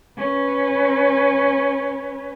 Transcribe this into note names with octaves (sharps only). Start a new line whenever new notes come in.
C#4 B4